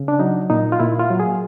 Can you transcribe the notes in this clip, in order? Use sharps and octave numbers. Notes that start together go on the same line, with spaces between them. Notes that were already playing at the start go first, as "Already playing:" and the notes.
Already playing: C#3
D4
F#3 D#4
A#2 D#4
F4
A#2 E4
F4
F#3
G#4